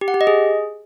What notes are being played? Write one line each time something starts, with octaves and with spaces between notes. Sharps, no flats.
G4
F#5
G4
D#5
G#4